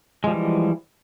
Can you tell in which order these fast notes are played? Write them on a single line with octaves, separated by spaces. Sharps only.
G#3 F3 G3 E3